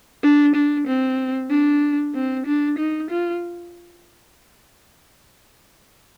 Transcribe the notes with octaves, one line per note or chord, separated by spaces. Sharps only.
D4
D4
C4
D4
C4
D4
D#4
F4